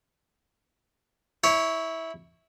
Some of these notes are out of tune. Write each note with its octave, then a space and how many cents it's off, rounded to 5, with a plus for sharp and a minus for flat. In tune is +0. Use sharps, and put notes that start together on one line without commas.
E4 -15 C#5 +5